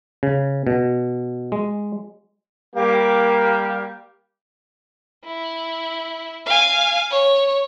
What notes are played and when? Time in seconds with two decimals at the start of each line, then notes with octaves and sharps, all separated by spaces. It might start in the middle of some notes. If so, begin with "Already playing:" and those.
0.23 C#3
0.67 B2
1.52 G#3
2.75 G3 A#3 G4
5.25 E4
6.46 F5 G#5
7.11 C#5